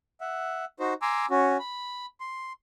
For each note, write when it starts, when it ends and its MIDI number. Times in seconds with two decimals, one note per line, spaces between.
0.21 0.65 76
0.21 0.65 78
0.80 0.94 63
0.80 0.94 66
0.80 0.94 72
1.02 1.26 80
1.02 1.26 82
1.02 1.26 84
1.02 1.26 86
1.02 1.26 88
1.30 1.57 61
1.30 1.57 66
1.59 2.06 83
2.20 2.53 84